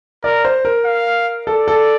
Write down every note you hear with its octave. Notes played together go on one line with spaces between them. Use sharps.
A#4 D5
C5
A#4
F5
A4 D5
A4